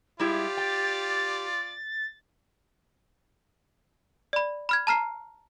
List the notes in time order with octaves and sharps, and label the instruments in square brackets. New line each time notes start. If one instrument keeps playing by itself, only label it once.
[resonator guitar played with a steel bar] G3 G#3 E4 [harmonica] F4 D5 [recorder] G4
[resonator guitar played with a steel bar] G5 [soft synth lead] A6
[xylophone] D5 B5
B5 F6 G#6
A5 A#5 F6 C7